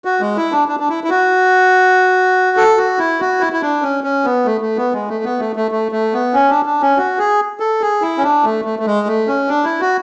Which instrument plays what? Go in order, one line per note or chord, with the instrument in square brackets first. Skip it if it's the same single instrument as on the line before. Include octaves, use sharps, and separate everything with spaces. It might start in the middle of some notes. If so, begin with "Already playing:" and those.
[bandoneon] F#4
G#3
E4
D4
D4
D4
E4
E4
F#4
A4
F#4
E4
F#4
E4
E4
D4
C#4
C#4
B3
A3
A3
B3
G#3
A3
B3
A3
A3
A3
A3
B3
C#4
D4
D4
C#4
F#4
G#4
A4
G#4
E4
C#4
D4
A3
A3
A3
G#3
A3
C#4
D4
E4
F#4